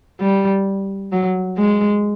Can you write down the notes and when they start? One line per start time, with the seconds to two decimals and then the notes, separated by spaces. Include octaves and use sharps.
0.20 G3
1.12 F#3
1.58 G#3